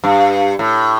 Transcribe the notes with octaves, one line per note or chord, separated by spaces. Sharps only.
G2
A2